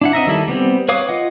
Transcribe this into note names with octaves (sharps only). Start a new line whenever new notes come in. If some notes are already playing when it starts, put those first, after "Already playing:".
D4 E4 F#5
C4 D#5 E5 A#5
D#3 G3 E4 A4
G3 B3 C4
B4 C#5 F5 D6 D#6
F4 D#5 F#5